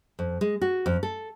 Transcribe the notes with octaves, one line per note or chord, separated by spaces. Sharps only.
F2
G#3
F#4
F2
A4